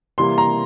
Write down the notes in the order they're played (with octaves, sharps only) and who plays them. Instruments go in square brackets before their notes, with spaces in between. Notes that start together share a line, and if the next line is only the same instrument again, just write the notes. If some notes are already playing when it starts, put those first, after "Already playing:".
[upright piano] C3 E3 G3 A#3 C6
A#5